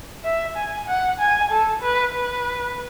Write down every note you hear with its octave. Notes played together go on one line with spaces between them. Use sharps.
E5
G#5
F#5
G#5
A4
B4
B4